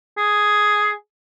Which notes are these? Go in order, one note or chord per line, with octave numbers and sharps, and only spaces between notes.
G#4